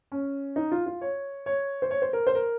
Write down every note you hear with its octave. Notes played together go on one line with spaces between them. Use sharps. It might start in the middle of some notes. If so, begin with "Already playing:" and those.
C#4
D#4
F4
F4
C#5
C#5
C5
C#5
C5
A#4
C5
A#4